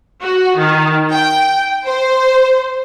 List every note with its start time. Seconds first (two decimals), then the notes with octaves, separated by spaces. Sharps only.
0.22 F#4
0.57 D#3
1.13 G5
1.87 C5